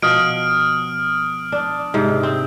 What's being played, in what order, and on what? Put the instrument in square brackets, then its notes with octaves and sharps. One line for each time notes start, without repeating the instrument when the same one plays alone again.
[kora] B2 F3 [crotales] D#6 F6 D7
[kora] D4
G#2 C3
C4